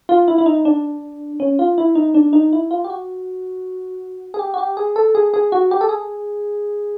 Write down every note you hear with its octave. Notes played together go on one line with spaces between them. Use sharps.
F4
E4
E4
D#4
D4
C#4
F4
E4
D#4
D4
D#4
E4
F4
G4
F#4
G#4
G4
F#4
G4
G#4
A4
G#4
G#4
F#4
G4
A4
G#4